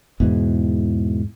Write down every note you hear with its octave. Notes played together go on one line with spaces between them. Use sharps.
E2 G#2 B2 E3